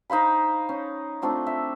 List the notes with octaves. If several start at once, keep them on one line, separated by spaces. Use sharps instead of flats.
D#4 C5 F5 B5
C#4
A3 C4 D4 F4
E5